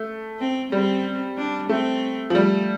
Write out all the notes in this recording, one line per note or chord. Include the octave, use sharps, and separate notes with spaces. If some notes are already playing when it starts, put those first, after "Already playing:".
Already playing: A3
C4
G3 C4
D4
A3 C4
F3
G3 A3